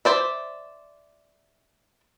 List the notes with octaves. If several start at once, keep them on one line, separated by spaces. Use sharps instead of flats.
C5 D5 E5